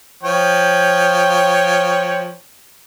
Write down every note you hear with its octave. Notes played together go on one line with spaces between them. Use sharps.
F3 C#5 G5